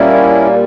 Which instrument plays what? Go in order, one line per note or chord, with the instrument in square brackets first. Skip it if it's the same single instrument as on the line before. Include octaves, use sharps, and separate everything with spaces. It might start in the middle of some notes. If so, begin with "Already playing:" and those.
Already playing: [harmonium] A#2 G3 A#3 C#4 E4